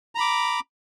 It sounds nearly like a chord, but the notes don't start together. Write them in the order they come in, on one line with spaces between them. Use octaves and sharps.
A#5 B5 D6